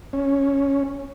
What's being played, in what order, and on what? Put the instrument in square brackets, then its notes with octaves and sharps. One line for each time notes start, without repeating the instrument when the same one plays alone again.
[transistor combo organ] C#4